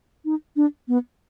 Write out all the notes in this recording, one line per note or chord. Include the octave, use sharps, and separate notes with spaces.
D#4
D4
B3